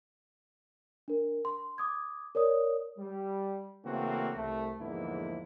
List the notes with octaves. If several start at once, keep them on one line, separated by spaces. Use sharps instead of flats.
D4 A#4
C6
D6 D#6 G#6
A#4 C#5 D5 D#6
G3
C#3 E3 A3 A#3 C4 F#4
C2 A3
E2 G#2 D3 F3 A#3 E4